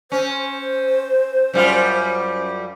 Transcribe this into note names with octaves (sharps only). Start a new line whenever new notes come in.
C#4 C5
F#2 G3 F4